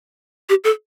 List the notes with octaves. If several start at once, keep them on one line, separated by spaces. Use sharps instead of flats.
G4
A4